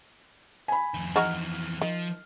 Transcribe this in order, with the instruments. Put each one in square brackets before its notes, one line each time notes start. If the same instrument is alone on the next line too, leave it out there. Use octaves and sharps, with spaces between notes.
[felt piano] G#5 B5
[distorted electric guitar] F2 D#3
[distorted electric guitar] F2 E3 [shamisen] D#4 F#4 G#4 [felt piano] F6
[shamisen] D#3 [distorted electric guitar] F3